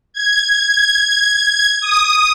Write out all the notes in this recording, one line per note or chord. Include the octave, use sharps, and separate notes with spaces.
G#6
D#6